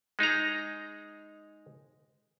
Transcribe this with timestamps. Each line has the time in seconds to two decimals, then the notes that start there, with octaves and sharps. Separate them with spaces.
0.19 G#3 D#4 G#4 A#5